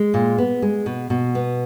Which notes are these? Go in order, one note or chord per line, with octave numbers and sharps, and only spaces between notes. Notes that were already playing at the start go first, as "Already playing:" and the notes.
Already playing: G#3
A#2
B3
G#3
B2
B2
B3